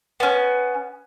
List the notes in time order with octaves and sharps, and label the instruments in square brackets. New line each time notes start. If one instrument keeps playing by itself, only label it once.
[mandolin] B3 C#4